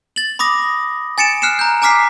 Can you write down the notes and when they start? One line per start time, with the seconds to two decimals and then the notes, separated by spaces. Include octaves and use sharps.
0.16 A6 F#7
0.39 B5 D6 D#6 A#6
1.18 G#5 A6 C#7 D7 E7
1.42 F6 F#6 C7 C#7 E7
1.59 A#5 G6
1.82 G#5 A#5 D6 F6 B6 C7